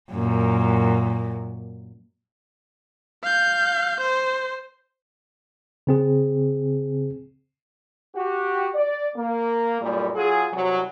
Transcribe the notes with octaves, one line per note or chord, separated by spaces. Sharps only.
F#2 A#2
F5 G6
C5
C#3 C4 G#4
F#4 G4
D5
A#3
B1 F#2 A#2 G3
F#3 F4 G#4
C2 F#3